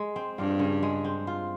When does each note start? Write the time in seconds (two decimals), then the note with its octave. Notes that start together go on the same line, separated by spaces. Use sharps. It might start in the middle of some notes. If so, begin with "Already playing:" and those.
Already playing: G#3
0.16 C4
0.38 G2 F4
0.59 C#3
0.83 G#3
1.04 C4
1.27 F4